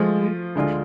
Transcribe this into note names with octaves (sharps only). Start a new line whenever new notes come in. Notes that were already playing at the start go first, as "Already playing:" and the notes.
Already playing: F3 G#3 A3 F4
D2 D3 G#3 D4 F4